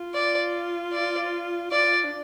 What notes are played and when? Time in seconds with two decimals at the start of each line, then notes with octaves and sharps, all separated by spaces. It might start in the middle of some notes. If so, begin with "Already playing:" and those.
Already playing: F4
0.14 D5
0.93 D5
1.71 F4 D5
2.04 D4